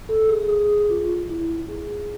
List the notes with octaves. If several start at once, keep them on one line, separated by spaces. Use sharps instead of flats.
A4
G#4
G#4
F4
E4
G#4